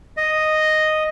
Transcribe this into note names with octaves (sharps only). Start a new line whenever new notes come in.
D#5